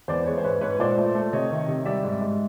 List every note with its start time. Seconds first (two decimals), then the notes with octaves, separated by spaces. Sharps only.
0.08 E2 C5 D5
0.26 G#3 B4 C#5
0.38 C5
0.44 G#2 B4 C#5
0.61 G#2 B4 C#5
0.79 A#2 C5 D5
0.97 A3
1.15 A3
1.33 C3 C#5 D#5
1.51 D#3
1.68 C3
1.86 G3 D5 E5
2.04 G#2
2.21 G#2